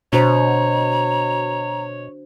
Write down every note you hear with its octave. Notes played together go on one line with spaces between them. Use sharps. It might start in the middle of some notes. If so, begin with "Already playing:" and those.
B2 D4 F#4 C5 C#5 A#5